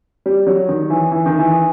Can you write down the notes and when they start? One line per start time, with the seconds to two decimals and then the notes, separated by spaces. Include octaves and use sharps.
0.26 G3
0.47 F#3
0.69 D#3
0.90 E3
1.11 E3
1.26 D#3
1.39 E3